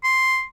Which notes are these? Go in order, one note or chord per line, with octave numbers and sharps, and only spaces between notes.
C6